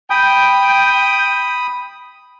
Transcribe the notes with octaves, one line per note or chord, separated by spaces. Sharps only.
G5 B5 D#6